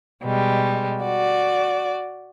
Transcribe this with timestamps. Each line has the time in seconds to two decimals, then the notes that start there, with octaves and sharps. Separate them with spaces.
0.24 B2 G3 G#3
1.02 F#4 D5